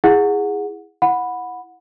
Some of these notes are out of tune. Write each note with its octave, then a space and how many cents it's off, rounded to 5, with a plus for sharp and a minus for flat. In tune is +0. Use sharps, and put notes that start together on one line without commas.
E4 +0 G#4 -10 F#5 -20
E4 +0 F#5 -20 B5 +0